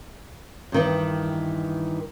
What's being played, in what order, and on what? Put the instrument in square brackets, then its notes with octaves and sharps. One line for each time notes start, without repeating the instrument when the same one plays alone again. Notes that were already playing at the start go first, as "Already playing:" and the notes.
[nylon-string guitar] G2 D#3 E3